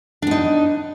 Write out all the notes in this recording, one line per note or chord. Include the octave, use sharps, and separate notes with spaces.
B3 D4 D#4